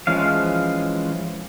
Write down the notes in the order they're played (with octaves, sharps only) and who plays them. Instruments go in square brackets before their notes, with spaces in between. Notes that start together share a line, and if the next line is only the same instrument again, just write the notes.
[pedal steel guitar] E3 F3 G#3 C#4 F5